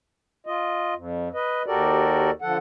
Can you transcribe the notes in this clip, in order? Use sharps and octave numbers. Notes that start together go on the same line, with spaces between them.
F4 D#5
F2
B4 D#5
D#2 F#4 G4 A4 A#4 D5
D3 F3 A4 F#5